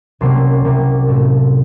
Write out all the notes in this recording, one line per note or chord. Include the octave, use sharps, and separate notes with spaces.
C2 C3 F#3 A#3 C#4 A5 C6
C2 C3 F#3 A#3 C#4
A2 A3 C4